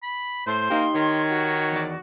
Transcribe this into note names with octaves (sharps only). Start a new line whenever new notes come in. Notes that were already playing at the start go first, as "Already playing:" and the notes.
B5
A2 C5 C6
A#3 D#4 G4
D#3 C#5
F#4
E2 D5